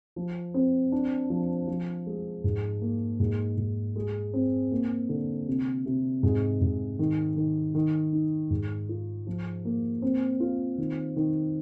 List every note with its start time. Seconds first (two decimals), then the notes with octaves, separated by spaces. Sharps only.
0.16 F3
0.54 C4
0.92 D4
1.30 F3
1.67 F3
2.07 G#3
2.44 G#2
2.81 A#3
3.20 G#2
3.58 G#2
3.96 G#3
4.34 C4
4.72 A#3
5.09 D3
5.48 C3
5.86 C3
6.23 G#2
6.61 G#2
6.99 D#3
7.36 D#3
7.75 D#3
8.13 D#4
8.50 G#2
8.89 F4
9.27 F3
9.65 A#3
10.02 C4
10.40 F4
10.78 D#3
11.16 D#3